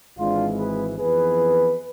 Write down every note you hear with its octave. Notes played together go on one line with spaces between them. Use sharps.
G#1 G#2 E3 G#3 C4 D4 F4
G#4 B4
F2 E3 B3 G#4 B4